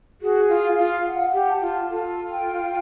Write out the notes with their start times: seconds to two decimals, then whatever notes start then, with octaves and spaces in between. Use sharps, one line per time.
0.21 F#4 G#4
0.49 F4
0.63 F5
0.78 F4
1.05 F#5
1.33 G4
1.47 A5
1.62 F4
1.90 F4 A4
2.32 G5